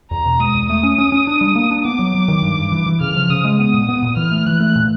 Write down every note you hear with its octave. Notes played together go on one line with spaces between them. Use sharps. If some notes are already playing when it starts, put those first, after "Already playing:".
E2 A#5
B2
G#3 D#6
E2
A3 D#6
C#4
C#4
C#4
D4
G3
A#3
D4
B3 D6
F#3
F#3
D#3
G2
G2
E3
E3
C#3 F6
F3
C#3 D#6
G#3
B3 D#6
A#2
B3
A#2
E3 F6
A3
E3 F#6
A3
A#2